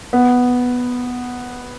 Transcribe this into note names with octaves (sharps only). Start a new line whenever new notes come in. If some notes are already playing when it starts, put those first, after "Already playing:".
B3